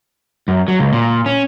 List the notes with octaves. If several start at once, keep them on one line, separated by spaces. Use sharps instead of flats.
F#2
F#3
C#2
A#2
C#4